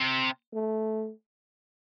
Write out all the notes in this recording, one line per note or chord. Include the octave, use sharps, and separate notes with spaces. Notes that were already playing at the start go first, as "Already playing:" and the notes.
Already playing: C3
A3